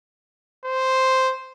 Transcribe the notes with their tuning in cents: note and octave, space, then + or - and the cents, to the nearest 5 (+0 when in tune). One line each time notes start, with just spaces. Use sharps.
C5 -5